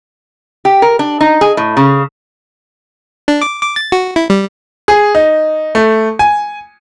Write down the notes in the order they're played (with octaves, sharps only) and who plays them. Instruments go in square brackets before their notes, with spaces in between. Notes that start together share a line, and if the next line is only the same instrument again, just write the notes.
[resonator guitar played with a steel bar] G4
A#4
D4
D#4
G#4
A2
C#3
[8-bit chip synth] D4
D6
D6
A6
F#4
E4
G3
[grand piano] G#4
D#4
A3
G#5